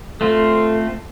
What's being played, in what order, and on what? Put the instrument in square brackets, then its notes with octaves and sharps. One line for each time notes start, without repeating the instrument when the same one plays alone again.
[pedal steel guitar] A3 C4 F4 [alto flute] A4